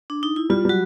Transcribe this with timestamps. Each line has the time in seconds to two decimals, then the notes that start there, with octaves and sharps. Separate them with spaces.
0.10 D4
0.23 D#4
0.36 E4
0.50 G3 F4
0.65 F#3 G3 F#4